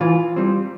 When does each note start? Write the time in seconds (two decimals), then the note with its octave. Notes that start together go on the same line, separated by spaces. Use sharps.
0.01 E3 F4
0.36 G3 C4